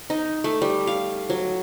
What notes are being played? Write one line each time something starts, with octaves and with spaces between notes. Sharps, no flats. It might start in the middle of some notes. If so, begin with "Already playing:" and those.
D#4
A3
G3
F5
F#3